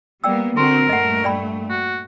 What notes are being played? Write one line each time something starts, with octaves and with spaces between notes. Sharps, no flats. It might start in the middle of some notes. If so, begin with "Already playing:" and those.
G3 A#3 B3 D5 G5 E6
D3 C4 F#4 A#4 C6
G2 A#2 A3 D#5 F#5
D5 G5 B5
F#4